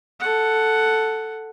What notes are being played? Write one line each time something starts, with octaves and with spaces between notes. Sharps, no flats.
A4 F#5